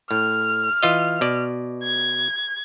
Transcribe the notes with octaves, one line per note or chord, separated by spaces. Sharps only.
A2 F6
E3 F4 D#5
B2 D5
G#6